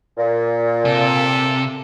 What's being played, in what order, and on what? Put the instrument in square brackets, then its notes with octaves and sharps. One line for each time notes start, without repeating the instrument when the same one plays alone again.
[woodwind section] A#2
[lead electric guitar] C3 [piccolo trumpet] A4